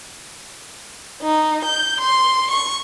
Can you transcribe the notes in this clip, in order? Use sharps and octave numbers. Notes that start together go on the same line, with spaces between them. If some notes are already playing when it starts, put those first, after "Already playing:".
D#4
G6
C6
C#6